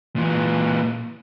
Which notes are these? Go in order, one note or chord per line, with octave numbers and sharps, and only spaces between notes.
A#2 E3